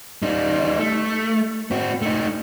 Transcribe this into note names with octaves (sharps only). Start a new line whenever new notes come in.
G3 D#4
A3
C4 F#4
A3 D#4